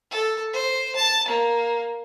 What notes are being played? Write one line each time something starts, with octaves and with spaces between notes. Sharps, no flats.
A4
C5
A5
A#3